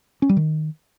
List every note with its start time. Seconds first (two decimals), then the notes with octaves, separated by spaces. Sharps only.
0.22 C#4
0.29 G3
0.37 D#3